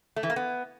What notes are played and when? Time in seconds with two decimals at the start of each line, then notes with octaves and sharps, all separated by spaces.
0.16 A3
0.23 E3
0.30 A#3
0.36 B3